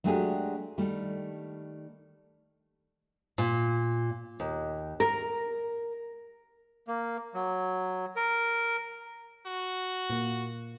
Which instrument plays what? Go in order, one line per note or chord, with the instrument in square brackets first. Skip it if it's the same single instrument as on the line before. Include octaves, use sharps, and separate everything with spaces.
[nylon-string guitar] F#3 G#3 A3 D4 G4 G#4
D#3 G3 A3
A#2
D#2
A#4
[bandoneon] A#3
F#3
A#4
[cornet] F#4
[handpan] A#2 A#3